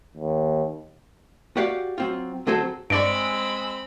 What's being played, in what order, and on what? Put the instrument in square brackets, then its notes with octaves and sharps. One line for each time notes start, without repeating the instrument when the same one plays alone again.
[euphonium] D#2
[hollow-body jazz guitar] F#4 G4 D5 F5 F#5
F#3 C4 F4
D3 F#3 C4 G#4 A4 C5
[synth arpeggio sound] G2 D5 C#6 [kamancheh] G#3 E6 [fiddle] C4 B5 [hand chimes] D7